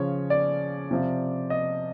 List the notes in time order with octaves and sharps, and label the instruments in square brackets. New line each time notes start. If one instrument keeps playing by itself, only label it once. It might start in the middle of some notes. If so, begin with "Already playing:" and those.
Already playing: [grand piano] C#3 F3 C#5
D5
C3 F3
D#5